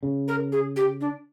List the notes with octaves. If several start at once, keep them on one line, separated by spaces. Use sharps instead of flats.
C#3
A#4
G#4
G4
D4